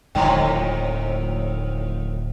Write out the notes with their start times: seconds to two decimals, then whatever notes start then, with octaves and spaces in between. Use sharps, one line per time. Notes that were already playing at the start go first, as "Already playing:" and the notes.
0.15 D1 F2 A2 D3 D#3 G#3 G5